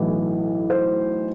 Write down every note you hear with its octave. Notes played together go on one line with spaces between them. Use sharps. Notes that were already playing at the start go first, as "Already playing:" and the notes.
Already playing: B1 A2 E3
C5